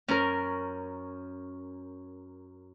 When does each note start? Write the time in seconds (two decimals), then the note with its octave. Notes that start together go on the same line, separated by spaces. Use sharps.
0.08 F#2 C#4 A#4